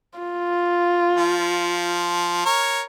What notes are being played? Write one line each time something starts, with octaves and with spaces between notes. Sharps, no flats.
F4
F3
A#4 C#5